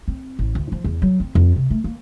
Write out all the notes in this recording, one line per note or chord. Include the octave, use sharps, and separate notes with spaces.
C4
A1
D2
F3
E2
F#3
C4
F2
C3
A3
A#3